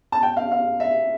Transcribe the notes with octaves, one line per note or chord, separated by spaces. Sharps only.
A5
G5
F5
F5
E5